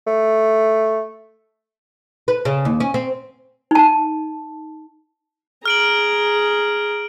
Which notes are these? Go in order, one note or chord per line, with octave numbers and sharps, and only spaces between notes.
A3
B4
C#3
D#2
C#4
C4
D#4 A5
G#4 A#5 F6 D7 F#7